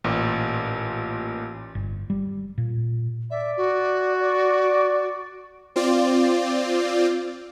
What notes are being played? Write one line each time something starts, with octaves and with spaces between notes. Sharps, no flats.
A1 A#2
G1
G3
A#2
D5 E5
F#4
D5
C4 F4 D5